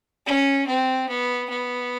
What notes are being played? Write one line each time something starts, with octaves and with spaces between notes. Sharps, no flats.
C#4
C4
B3
B3